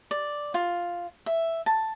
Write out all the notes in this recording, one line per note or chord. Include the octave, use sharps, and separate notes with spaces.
D5
F4
E5
A5